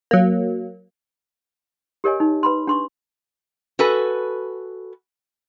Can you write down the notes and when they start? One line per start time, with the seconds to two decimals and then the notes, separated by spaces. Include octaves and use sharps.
0.11 F#3 A#3
2.04 G4 A#4 C#5 D#5 G#5
2.20 D#4
2.43 B4 B5 C6
2.67 D4 C6 C#6
3.79 F#4 A4 B4 G#5